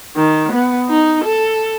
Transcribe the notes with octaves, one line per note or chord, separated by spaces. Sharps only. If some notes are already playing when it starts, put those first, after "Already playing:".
D#3
B3
D#4
A4